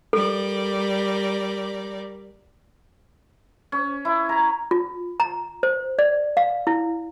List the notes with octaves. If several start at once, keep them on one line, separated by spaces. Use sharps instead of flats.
G3 A4 A#4 D5
C#4
E4
A#5
F4
A#5
C5
D5
F5
E4